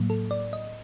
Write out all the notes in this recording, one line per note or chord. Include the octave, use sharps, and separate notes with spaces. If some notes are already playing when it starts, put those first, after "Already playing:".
Already playing: A2 F#3 A#3
A4
D5
D#5